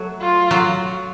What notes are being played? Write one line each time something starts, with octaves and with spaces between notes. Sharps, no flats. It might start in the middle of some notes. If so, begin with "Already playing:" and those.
Already playing: F#3 A3
F4
F#3